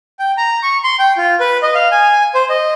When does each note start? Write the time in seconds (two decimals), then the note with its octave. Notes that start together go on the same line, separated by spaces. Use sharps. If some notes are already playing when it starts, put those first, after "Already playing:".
0.19 G5
0.38 A#5
0.63 C#6
0.84 C6
0.99 G5
1.17 F4
1.40 B4
1.62 D#5
1.75 F5
1.92 G#5
2.35 C5
2.49 D#5